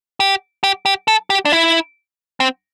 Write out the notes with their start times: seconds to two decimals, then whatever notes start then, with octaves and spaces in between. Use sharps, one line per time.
0.20 G4
0.64 G4
0.86 G4
1.08 A4
1.30 G4
1.45 D4
1.52 E4
2.40 C4